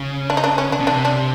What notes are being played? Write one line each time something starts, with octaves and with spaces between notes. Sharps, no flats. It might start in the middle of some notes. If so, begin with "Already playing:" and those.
Already playing: C#3
D4
D#4
D4
C#4
D4
B2
C3 D4
D4